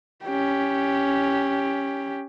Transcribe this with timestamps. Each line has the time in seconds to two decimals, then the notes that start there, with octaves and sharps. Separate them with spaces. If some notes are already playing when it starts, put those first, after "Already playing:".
0.25 C#4 G4